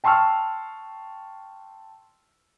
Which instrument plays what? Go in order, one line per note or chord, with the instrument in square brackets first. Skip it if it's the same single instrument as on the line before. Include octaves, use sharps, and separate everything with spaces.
[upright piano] G5 A5 C6 C#6 E6 F6